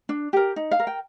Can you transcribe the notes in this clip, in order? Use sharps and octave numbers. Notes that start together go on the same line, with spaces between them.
D4
G4 A#4
D#4
F5
A#4
G5